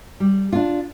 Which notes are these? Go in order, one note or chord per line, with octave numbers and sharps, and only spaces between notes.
G3
D4 F4